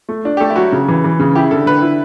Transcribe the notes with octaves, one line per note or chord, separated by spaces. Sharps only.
A3
D4
G4
A3 A4
E4
F#3 F#4
C#3
E3
E3
C#3
E4 G4
D3 A4
D3 B4
E4